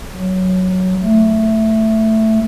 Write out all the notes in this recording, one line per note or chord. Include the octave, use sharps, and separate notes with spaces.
F#3
A3